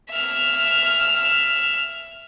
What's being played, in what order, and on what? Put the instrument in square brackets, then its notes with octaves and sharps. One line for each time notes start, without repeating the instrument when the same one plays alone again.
[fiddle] E5 F6